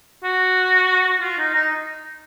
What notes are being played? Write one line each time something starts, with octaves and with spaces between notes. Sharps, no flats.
F#4
F4
D#4
D#4